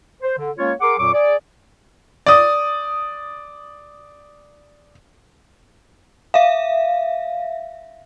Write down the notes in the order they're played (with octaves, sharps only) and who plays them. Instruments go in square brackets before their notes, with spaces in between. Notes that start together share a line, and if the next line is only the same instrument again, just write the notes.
[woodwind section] C5
D3
G#3 A#3 C#4 F4 C#5
G#4 A#4 F#5 C6 D6
F2 A#2 F#3 C#6 D6
G#4 D5
[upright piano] D5 D#6
[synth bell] E5 F5